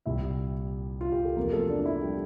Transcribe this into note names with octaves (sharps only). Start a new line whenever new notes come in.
C2 A#2 G3 E4 E5
F4
G4
A4
E2 C3 F3 A#3 A#4
A3 A4
D4
D4
E4
G3 G4